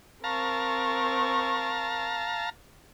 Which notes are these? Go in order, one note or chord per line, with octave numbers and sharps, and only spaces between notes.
C4 A#4 F5 A5 A#5 C#6